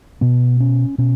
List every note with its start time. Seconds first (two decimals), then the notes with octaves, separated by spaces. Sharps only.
0.21 B2 B3
0.60 C#4
0.98 B2 C#4